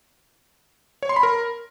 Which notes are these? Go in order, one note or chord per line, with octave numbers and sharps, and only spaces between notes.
C#5
C6
B5
A#4